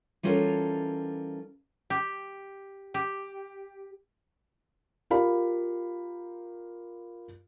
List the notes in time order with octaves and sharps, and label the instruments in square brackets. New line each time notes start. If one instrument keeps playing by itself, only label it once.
[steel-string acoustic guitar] E3 G3 C#4 F4 A4 A#4
[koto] G4
G4
[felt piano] F4 G4 A#4 F5 B5